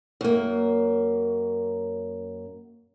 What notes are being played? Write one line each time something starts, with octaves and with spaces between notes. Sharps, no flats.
F#2 A#3